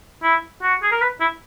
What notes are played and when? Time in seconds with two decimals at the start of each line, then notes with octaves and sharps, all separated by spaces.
0.23 E4
0.63 F#4
0.83 G#4
0.92 A#4
1.01 B4
1.21 E4